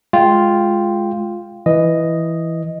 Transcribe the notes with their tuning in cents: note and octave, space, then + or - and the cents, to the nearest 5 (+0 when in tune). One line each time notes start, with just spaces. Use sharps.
G#3 +15 F4 +0 G5 +0
E3 +0 D#5 +0